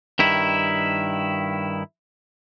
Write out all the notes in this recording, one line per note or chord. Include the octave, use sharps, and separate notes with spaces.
G2 D#3 E4